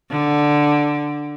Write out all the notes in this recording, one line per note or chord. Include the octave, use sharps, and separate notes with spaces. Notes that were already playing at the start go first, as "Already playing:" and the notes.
D3